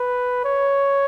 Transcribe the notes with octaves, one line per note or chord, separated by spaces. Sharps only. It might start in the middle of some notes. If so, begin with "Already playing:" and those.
Already playing: B4
C#5